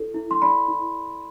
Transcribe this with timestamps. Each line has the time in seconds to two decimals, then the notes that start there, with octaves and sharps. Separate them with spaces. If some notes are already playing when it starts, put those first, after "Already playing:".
Already playing: E4 A4
0.14 E4
0.31 C6
0.41 D5 B5
0.68 E4